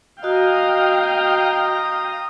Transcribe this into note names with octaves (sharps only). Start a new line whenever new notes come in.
F#4 D#5 F5 G5 A#5 D#6